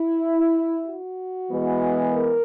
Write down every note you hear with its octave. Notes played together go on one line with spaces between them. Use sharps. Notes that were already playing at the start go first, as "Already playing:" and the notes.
Already playing: E4
F#4
E3 G#3 B3
A#4